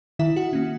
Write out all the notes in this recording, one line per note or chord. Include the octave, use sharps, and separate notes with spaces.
D#3 E4 E5
F#4 F#5
A#3 C#4